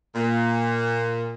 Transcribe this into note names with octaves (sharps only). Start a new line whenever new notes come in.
A#2